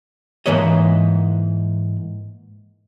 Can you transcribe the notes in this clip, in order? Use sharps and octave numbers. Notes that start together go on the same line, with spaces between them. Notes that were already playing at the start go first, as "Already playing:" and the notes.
G#2 E3 A#3 B4 C#5 D#5